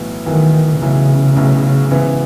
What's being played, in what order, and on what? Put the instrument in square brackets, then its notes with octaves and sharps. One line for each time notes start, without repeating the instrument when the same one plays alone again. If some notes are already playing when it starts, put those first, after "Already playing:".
Already playing: [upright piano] B1 A2 E3 B3
[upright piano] B1 A2 E3 B3 [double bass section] D#3
[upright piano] B1 A2 E3 B3 [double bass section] C#3
[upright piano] B1 A2 E3 B3
G#1 G#2 E3 B3 E4